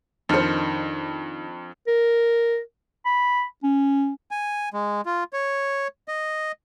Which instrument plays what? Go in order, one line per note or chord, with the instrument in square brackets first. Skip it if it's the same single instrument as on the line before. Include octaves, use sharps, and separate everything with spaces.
[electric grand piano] F2 [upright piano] D#3 F6 C#7 [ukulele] D4 C5
[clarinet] A#4
B5
C#4
[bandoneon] G#5
G#3
F4
C#5
D#5